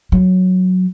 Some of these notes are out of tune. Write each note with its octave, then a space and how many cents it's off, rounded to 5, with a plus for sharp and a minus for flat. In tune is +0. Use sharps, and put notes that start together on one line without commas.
F#3 -5